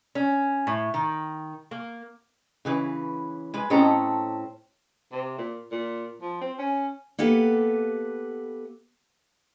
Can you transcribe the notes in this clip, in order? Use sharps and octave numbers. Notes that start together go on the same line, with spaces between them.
C#4
A2
D#3
A#3
C#3 E3 B4
G#3 B4
A2 C4 C#4 A4 D#5 A#5
C3
A#2
A#2
F3
C4
C#4
A#3 B3 G4 A4 B4 F#5